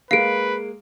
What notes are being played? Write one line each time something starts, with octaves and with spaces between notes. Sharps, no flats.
G#3 A#3 B4 F5 C7 D7